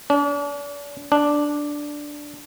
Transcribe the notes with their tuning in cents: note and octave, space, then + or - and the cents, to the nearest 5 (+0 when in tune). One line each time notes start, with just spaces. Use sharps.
D4 -40
D4 +0